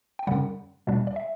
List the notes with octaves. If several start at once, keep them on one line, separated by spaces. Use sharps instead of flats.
G5
F#2 C#3 G3 F#5
E2 B2 G3 D4
D5
E5